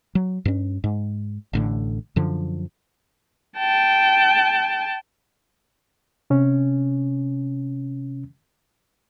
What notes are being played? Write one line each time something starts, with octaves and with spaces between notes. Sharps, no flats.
F#3
G2 C#4
G#2
A1 A2 D3
F#2 D3 F3
G5 A5
C3 C#4